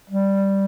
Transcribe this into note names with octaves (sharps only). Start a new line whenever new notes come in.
G3